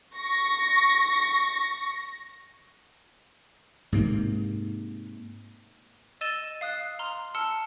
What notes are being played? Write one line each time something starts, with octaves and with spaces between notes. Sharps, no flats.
C#6 A#6
G#2 C3 A#3
D#5 E6 A6 D#7 E7 G7
F5 D#6 F#6
A#5 C6 F6
A5 E6 F6 C#7 G7